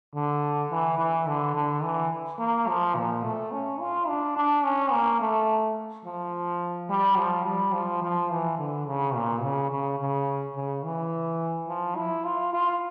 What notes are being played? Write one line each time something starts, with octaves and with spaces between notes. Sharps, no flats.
D3
E3
E3
D3
D3
E3
A#3
F3
A#2
A3
C#4
F4
D4
D4
C#4
A#3
A3
F3
G3
F3
G3
F3
F3
E3
D3
C#3
A#2
C#3
C#3
C#3
C#3
E3
F3
E4
F4
F4